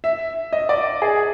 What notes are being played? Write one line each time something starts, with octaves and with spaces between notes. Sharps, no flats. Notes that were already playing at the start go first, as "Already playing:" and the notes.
E5
D#5
D5
G#4